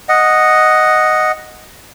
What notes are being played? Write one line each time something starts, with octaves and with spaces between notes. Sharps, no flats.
D#5 F#5